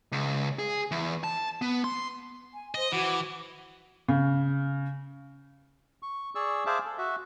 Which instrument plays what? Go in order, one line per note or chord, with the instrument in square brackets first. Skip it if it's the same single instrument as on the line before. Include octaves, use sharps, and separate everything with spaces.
[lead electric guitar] C#2
G#4
E2
A5
B3
C6
[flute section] G#5
[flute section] C5 [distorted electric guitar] D#5
[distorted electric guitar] E3 [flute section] F#4 F#5 D6
[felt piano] C#3
[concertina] C#6
G#4 D5 C#6 E6
G#4 C5 E5 F5 A5 D6
A4
F#4 E5